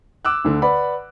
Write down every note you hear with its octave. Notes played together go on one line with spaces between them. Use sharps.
D6 E6 F#6
D2 D3
B4 D5 F#5 B5